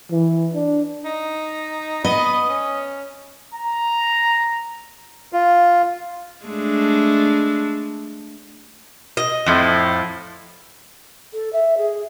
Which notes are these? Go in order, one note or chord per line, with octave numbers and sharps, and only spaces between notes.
E3
D4
D#4
B3 D#5
C#4
A#5
F4
G#3 A3 D4
D#5
F2 A2 F3
A4
E5
G#4